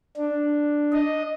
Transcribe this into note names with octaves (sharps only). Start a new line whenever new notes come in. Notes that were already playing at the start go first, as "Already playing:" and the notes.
D4
D#5